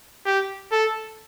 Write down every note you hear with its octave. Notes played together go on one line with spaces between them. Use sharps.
G4
A4